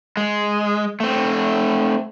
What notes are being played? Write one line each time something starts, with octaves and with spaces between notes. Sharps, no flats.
G#3
A3 C4